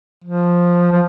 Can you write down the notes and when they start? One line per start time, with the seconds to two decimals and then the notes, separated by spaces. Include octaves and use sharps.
0.24 F3
0.92 F3